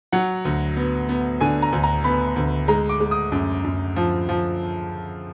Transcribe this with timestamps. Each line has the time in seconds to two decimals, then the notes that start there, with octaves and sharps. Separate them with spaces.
0.12 F#3 F#5
0.45 D2
0.77 B3
1.09 B3
1.41 D3 G#5
1.62 A#5
1.73 D2
1.84 A#5
2.04 B3 B5
2.36 D2
2.68 G#3 A#5
2.89 D6
3.00 G#3
3.11 D#6
3.32 F#2
3.64 F#2
3.96 F3
4.29 F3